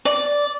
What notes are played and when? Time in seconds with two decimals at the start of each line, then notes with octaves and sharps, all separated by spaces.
0.05 D5